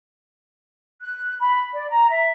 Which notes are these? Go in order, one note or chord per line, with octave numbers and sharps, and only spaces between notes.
F#6
B5
D5
A#5
E5